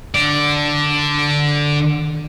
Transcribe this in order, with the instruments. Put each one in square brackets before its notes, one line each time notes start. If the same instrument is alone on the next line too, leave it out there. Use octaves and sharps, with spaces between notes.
[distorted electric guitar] D3 D5